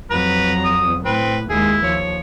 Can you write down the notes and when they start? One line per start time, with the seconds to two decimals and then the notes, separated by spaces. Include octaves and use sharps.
0.10 F2 F#3 B4 A#5
0.65 D#6
1.05 A2 C4 B4
1.50 D#2 G#3 E4 G#4
1.83 D#2 F3 C#5